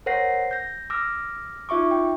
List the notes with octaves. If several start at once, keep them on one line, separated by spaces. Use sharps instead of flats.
A#4 C5 C#5 F#5 A#6 C7
G6 A#6
D6 E6 F6 A#6
D#4 F4 E5 C#6 D6
G5